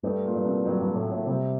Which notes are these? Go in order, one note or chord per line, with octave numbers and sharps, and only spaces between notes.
G2 A3
A#2
G2
C2
G2 F#3
G2 A3
A2
A#2
A2
C3 G3